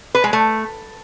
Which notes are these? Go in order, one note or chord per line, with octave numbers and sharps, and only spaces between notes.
B4
G#3
A3